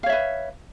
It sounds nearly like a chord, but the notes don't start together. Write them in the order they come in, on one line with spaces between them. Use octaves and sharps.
F5 C#5 E5 B4